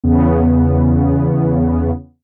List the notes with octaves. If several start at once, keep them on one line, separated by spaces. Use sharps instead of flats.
E2 C#3 B3